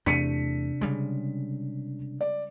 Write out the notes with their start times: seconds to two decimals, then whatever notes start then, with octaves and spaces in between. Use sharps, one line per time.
0.06 E2 C3 A3 D4 B6 C#7 D#7
0.81 C#3 G3 G#3
2.21 D5